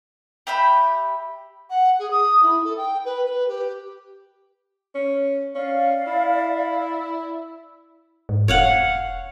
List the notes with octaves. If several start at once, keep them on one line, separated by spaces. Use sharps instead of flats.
G4 E5 G5 B5
F#5
G#4
D#6
E4
A4
G5
B4
B4
G4
C#4
C#4 D5 F5
E4
G#2
E1 C#5 F5 F#5